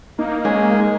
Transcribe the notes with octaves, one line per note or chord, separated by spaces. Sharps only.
A#3 D#4
G#3 C#4